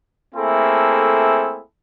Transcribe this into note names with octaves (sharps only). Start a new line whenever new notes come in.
A3 A#3 C4 E4 G#4 A4